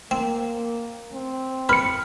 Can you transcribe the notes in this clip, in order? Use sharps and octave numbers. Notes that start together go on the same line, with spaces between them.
A#3 C4
C4
B4 B5 F6 C#7